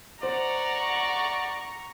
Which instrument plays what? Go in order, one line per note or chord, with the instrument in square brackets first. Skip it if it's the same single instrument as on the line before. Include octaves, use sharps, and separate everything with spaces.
[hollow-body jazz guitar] C5 [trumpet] D5 [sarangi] F#5 [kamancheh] A#5 C#6